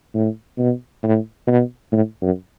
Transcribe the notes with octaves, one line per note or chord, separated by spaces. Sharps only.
A2
B2
A2
B2
A2
F#2